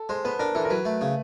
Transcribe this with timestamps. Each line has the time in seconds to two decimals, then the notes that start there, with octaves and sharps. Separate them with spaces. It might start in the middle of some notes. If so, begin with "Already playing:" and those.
Already playing: A4
0.09 G#3 C5
0.25 B3 B4
0.39 D4 A#4
0.55 E3 A4
0.65 A#4
0.70 F#3 B4
0.85 A3
1.01 C#3